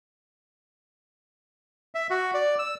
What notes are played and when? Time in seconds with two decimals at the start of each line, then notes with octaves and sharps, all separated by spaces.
1.95 E5
2.10 F#4
2.34 D5
2.59 E6